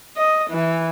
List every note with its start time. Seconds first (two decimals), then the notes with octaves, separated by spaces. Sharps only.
0.17 D#5
0.51 E3